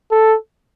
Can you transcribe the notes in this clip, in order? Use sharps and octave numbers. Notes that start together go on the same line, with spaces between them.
A4